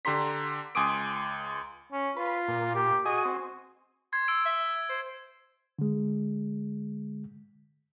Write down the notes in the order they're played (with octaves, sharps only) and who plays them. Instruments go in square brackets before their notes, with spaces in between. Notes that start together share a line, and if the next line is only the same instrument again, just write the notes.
[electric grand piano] D3 G4 A#5 C6 B6
C#2 G#5 C6 D6 D#6 D7
[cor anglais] C#4
[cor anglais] F4 [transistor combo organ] B4
[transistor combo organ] A#2
[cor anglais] G4
[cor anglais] F#4 [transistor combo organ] G#4 D#5 D#6
[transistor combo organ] C4
[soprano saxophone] C6 [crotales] G#6
[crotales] E6 D7
[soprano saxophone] E5
C5
[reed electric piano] D3 G#3